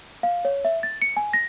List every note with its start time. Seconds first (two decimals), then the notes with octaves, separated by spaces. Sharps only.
0.23 F5
0.45 C#5
0.65 E5
0.83 A6
1.02 C#7
1.17 G#5
1.33 A#6